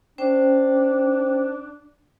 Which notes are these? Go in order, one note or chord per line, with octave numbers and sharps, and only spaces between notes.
C#4 D4 C5 G5